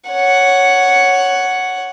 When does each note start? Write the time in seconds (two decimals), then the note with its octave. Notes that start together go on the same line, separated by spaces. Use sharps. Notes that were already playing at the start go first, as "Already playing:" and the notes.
0.10 C#5 F#5